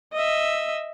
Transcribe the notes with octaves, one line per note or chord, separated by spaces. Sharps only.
D#5 E5